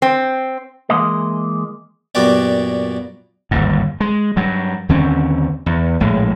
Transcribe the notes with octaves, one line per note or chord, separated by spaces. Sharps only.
C4
E3 G#3 A#3 D#5
F#2 A#2 B3 F#4 G4 D5
G1 D#2 G#2
G#3
G2 F#3
D#2 D3 C4 C#4
E2
A#1 A2 G#3